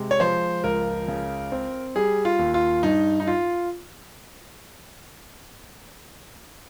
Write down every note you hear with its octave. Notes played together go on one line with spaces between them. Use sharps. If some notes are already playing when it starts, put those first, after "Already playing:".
Already playing: C3 G#3
C#5
F3 C5
C#2 A#4
C#3
C4
G3 G#4
F4
D#2
F4
G2 D#4
D#4
F4